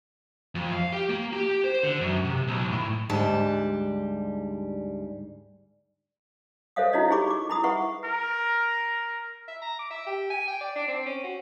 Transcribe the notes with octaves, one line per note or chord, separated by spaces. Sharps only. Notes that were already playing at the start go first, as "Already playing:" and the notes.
F2
F5
G4
A#3
G4
C5
D3
F#2
C3
B1
A2
D2 G#2 G3 A5
A4 C5 C#5 E5 F5 D#6
D#4 E4 F#4 C#5 D#5
G4 G#4 C#5 B5 C#6 D6
D6
E4 B5 D#6
G#4 B4 E5 F#5 C#6
A#4
E5
A#5
D6
E5
G4
G#5
G5
D5
D4
C4
C#4
F#4